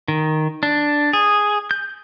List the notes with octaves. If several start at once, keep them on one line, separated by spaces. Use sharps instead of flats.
D#3
D4
G#4
G6